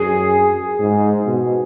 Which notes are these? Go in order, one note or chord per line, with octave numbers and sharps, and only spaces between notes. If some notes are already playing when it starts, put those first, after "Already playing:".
Already playing: F#2 G#4
G#2
B2